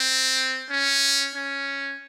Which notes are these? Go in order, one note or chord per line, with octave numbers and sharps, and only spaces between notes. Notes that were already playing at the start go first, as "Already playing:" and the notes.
Already playing: C4
C#4
C#4